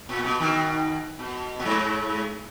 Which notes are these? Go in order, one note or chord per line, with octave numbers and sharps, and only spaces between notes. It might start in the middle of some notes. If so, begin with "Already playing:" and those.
A#2
B2
B2 D#3
B2
A#2
G#2